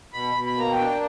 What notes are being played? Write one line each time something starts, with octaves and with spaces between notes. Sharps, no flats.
B2 B5
B2
B5
A#3 A#5
G5
D4